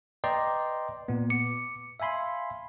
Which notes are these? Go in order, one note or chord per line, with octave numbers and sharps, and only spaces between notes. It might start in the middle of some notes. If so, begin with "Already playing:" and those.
B4 D5 D#5 G5 A#5 C6
A#2 B3
D6 C#7
E5 F5 G#5 B5 C6